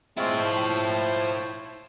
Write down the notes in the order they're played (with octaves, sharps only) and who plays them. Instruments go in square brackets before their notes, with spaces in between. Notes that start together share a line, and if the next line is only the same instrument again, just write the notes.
[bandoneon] G#3 C4 F4 [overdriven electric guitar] E4 C#5
[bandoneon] F3 C5